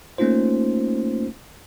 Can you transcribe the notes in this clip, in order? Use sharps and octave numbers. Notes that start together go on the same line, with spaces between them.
A3 A#3 C#4 D#4 F4 C5